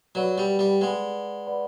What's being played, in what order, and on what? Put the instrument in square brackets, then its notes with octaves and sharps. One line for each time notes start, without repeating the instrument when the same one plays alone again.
[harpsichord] F#3 [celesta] B4 D5 F#5 B5
[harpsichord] G3
G3
[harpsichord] G#3 [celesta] B4 D5 F#5 B5
[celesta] B4 D5 F#5 B5